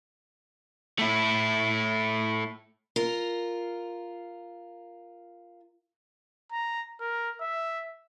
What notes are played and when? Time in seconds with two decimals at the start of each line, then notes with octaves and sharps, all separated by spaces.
0.99 A3 E4
2.96 F4 A#4
6.52 A#5
7.01 A#4
7.41 E5